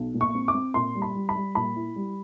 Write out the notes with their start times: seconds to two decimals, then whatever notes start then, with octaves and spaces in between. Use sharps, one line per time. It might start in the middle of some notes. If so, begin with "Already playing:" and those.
Already playing: B1
0.14 A#2
0.21 C#6
0.35 C4
0.48 D6
0.54 C4
0.74 A#2 C6
0.95 G3
1.02 B5
1.15 G3
1.29 B5
1.35 G3
1.55 A#2 B5
1.76 E4
1.96 G3